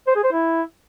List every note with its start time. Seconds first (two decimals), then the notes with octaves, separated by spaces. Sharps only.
0.08 C5
0.16 G#4
0.24 C5
0.32 E4